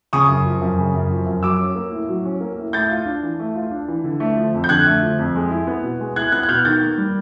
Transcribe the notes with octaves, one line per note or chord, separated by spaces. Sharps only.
C#3 C#6 D#6
F#2
F3
F#2
C#3
F#2
F3
F#2
F#3 D6 E6
C#4
A#3
A2
F#3
C#4
A#3
A2
A3 G6 A6
F4
D4
E3
A3
F4
D4
E3
D3
A3
F3
F2
G6
D3 F#6 G#6
A3
F3
F2
G#3
E4
B3
B2
G#3
E4 F#6 G#6
B3 F#6 G#6
F#6
B2 F6 G6
D#3 G6 A6
A#3
G3